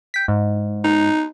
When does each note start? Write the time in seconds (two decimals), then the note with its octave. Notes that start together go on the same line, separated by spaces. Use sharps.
0.14 G5 B6
0.28 G#2
0.84 D#4